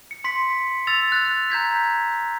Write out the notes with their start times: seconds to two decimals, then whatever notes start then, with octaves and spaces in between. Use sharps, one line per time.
0.11 C#7
0.24 C6 B6 C#7
0.87 E6 A6 F7
1.12 F#6 A6
1.50 A#5 G6 G#6 B6